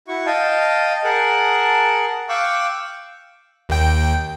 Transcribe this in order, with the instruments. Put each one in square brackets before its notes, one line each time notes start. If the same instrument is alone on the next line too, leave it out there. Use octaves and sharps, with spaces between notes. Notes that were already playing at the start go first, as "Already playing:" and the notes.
[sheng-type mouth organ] E4 F#4 C#6
D#5 F5 G5 A5
G#4 A#4 F#5 A5
F5 G5 C#6 D6 E6 F#6
[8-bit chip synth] D#2 G5